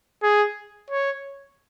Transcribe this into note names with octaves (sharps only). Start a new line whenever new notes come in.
G#4
C#5